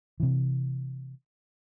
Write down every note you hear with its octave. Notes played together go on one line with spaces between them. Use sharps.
C3 E3